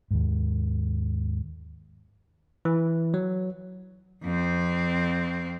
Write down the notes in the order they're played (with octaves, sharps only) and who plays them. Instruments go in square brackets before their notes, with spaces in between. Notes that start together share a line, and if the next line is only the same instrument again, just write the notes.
[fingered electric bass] D#2 G#2
[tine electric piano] E3
F#3
[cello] F2 C4